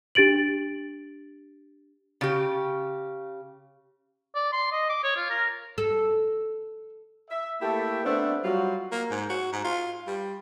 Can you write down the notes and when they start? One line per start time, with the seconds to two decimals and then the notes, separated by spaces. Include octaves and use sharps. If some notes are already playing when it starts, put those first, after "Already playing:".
0.15 D4 G4 A6 D7 F#7
2.21 C#3 G4
4.35 D5
4.53 C6
4.72 D#5
4.90 D6
5.04 C#5
5.16 F4
5.30 A#4
5.78 A4
7.30 E5
7.61 A3 A#3 E4 G4 A4
8.04 A3 B3 C4 D4 E5 F#5
8.44 F#3 G3 F4 F#4
8.92 A#3
9.11 G#2
9.29 F#4
9.52 G#2
9.64 F4
10.07 G3